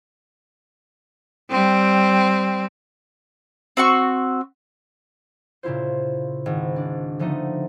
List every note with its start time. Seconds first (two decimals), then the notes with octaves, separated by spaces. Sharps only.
1.50 G3 C4
3.77 C4 F#4 C#6
5.63 A#2 C#3 E4 F4 C5
6.46 G#1
6.76 D4
7.19 D3 F3 A3 B3 D#4